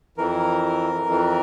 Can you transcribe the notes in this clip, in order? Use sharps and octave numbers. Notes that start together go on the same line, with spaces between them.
F2 E3 A#4
F2 E3